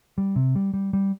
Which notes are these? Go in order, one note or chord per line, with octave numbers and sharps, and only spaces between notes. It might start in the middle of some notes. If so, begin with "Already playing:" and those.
G3
C3
G3
G3
G3